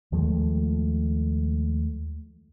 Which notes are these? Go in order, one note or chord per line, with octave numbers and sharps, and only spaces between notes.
D#2 F3 G#3 A3